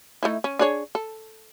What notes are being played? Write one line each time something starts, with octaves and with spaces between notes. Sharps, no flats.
A3 D#4 E4
C#4
D4 G#4 C#5
A4